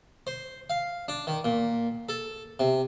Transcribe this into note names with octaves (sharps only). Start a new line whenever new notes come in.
C5
F5
D4
D#3
A#2
A4
C3